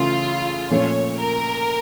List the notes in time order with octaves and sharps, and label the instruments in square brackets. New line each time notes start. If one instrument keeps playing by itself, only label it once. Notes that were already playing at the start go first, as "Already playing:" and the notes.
Already playing: [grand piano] C#3 E3 A3 C#4 [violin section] F4
[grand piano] A#2 F3 A3 C#4 [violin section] C#5
[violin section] A#4